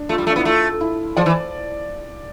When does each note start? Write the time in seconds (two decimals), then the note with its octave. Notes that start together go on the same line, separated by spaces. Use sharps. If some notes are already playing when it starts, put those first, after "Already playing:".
Already playing: D4
0.09 A3 F4
0.18 G3
0.27 A3
0.29 D4
0.36 B3 E4
0.45 A3 F4
0.81 E4
1.17 F3 D5
1.26 E3